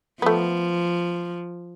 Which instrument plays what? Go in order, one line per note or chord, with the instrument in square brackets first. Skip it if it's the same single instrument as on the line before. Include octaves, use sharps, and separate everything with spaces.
[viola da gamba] F3 [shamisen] A3 B3